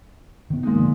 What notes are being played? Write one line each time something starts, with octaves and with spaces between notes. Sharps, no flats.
D#3 B3
A#2 G#3 D#4
D3 D#3 F3